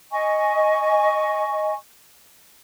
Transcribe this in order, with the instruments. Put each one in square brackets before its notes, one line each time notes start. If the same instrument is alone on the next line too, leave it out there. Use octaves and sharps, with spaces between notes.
[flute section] D#5 G#5 C#6